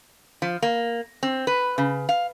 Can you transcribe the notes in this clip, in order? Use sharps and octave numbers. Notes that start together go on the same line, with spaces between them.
F3
A#3
C4
B4
C#3
F5